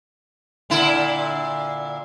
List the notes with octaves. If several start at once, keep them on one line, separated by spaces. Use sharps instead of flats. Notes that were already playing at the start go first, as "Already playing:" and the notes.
A#2 D3 E4